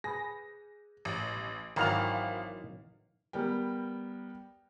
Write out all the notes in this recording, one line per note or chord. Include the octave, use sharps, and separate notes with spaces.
G#4 B4 A#6
A1
G#1 D#3 E3 F#3 F5 F7
G3 B3 A#4 G5